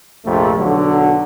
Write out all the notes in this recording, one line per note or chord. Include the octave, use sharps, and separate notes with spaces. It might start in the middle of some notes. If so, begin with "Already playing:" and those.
A#1 F2 C3 A3
B1 D3 F#3